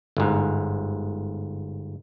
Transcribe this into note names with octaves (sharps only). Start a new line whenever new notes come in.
G1 G#2